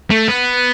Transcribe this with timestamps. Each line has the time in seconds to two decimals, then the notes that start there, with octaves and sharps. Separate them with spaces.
0.10 A3
0.28 B3